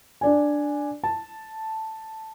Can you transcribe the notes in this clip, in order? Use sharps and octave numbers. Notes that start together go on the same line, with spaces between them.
D4 D5 G#5
A5